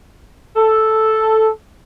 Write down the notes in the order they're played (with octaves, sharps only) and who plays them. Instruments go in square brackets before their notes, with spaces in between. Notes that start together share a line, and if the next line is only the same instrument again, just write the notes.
[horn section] A4